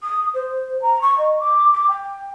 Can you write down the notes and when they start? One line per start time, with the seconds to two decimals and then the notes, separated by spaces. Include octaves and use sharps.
0.03 D#6
0.34 C5
0.82 A#5
1.02 C#6
1.18 D#5
1.40 D6
1.73 D6
1.89 G5